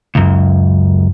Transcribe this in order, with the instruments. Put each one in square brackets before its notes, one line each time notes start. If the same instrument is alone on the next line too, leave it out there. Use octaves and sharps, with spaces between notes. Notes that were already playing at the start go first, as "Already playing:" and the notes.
[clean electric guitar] C#2 F#2